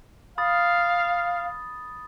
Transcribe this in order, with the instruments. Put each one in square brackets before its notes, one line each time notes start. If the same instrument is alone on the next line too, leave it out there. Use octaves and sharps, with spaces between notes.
[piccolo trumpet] F5 [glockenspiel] B5 D#6 A6